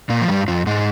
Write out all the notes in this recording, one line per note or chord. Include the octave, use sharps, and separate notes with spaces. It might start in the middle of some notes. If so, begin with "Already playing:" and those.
A#2 A#3
F3
G2 G3
F2 F3
G#2 G#3